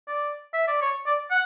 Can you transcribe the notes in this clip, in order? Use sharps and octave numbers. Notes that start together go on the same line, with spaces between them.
D5
E5
D5
C#5
D5
F#5